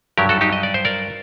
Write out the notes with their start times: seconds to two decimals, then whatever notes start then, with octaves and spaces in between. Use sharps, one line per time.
0.17 G2 F#3 G4 A#4
0.29 F#4 A4
0.41 D#4 G4
0.53 D#5
0.63 D5
0.74 C5
0.85 A#4 D5